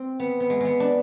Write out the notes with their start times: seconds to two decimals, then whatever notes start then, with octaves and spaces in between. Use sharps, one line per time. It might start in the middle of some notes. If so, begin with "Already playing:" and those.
Already playing: C4
0.20 B3
0.40 B3
0.50 G#3
0.60 G#3 B3
0.80 D4